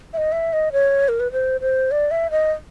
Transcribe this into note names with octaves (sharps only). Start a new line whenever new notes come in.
E5
D#5
E5
D#5
C#5
A#4
B4
C5
C5
D5
E5
D#5